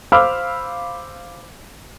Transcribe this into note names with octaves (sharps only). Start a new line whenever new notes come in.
C5 F5 B5 D6 E6 F6